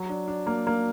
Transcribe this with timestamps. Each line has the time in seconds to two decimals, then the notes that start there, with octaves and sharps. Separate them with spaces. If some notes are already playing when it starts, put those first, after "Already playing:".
Already playing: F#3
0.09 D4
0.28 D4
0.47 A#3
0.67 A#3